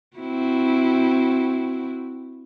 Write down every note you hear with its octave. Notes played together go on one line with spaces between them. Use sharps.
C4 E4 F#4